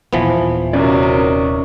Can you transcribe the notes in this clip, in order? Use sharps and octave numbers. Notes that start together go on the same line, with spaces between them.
D#1 E3 F3 B3
C3 D#3 F#3 C#4 D5